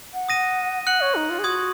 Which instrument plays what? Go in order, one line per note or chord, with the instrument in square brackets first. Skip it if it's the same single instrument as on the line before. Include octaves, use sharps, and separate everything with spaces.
[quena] F#5
[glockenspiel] D#6 A#6 D#7
[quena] F#5 [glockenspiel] F#6 C#7 F#7
[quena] C#5
D#4
F4
G#4
[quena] F#4 [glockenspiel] C6 D#6 G#6